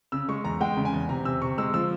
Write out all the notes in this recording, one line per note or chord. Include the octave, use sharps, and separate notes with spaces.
C#3 E6
G#3 C#6
E2 A#5
G#3 G5
C#3
G#5
E2
C3 A#5
C3 E6
C3 C#6
G#3 E6
F3 E6